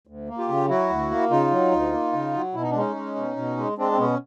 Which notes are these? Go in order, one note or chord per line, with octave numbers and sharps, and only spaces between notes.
D2
A#3
F4 G4
C#3
F#3 E4 F#4
D2
A#3
C#3 D#4 F4
F#3
D2
A#3
C#3
F#3
B2 E4
D#4
D4
G#3 C#4 D#4
G#3
B2
B2
G#3
G#3 C4 D4
C4
B2 B3 C#4